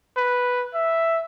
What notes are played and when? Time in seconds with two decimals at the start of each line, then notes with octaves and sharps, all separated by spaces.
0.17 B4
0.74 E5